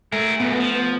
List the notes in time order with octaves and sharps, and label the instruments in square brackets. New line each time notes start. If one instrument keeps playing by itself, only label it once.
[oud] A3 [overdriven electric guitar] G#4 A#4
[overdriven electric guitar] F#2 A#2 [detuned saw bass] B3
[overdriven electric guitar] F3